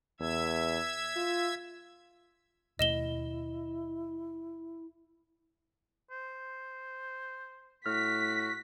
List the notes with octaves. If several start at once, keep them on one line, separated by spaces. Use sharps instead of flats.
E2 E5 E6 G#6
F4
D#2 B2 A3 E4 D#5 E7 G7
C5
A2 F#4 F6 B6